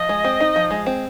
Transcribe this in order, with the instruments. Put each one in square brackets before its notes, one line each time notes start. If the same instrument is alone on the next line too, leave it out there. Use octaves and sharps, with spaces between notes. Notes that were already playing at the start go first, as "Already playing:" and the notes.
Already playing: [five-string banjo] F3 [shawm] D#5
[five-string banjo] G#3
C4
D#4
F3
G#3
C4